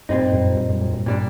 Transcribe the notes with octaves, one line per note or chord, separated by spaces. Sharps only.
G2 A#2 G3 C4 D#4
F#2
G2
F#2
G2
G2
A#2 G3 D4